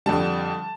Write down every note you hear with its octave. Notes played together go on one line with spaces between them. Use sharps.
F2 D3 G3 A5